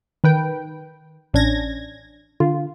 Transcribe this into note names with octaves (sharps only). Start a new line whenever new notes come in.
D#3 B4 G5
A1 C#4 D4 G#6 A#6
D3 F4